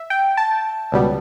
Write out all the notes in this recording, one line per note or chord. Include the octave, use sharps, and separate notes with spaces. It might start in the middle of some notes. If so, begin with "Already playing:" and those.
Already playing: E5
G5
A5
C#2 B2 G3 B3